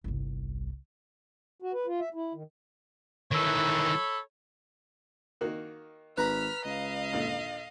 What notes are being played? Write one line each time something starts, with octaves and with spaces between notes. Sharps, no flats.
G1 C2
F#4
B4
F4
E5
E4
D#3
D#3 E3 A4 C#5 B5
D#3 A#3 F#4
G#1 B4 A#5 B5 F6 B6
C#2 D#5 F5
D#2 A#2 D3